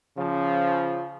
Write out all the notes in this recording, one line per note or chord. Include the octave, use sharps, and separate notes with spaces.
C#3 F3